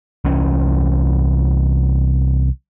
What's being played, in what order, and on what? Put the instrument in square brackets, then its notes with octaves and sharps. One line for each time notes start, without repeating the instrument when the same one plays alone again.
[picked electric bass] C2 E3 C#4